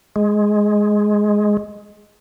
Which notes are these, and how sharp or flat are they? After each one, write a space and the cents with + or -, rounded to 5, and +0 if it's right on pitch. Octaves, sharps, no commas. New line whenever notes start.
G#3 +5